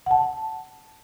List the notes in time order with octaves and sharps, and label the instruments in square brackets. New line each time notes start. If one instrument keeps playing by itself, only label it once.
[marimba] F#5 A5